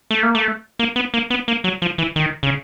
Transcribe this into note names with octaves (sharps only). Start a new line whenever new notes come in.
A3
A#3
A3
A#3
B3
A#3
B3
A#3
F#3
F3
E3
D#3
C#3